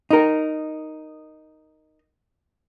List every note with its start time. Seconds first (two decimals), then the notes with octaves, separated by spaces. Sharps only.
0.11 D#4 A#4